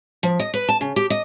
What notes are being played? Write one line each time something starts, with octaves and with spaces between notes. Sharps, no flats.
F3
D#5
B4
A5
C#3
G4
D#5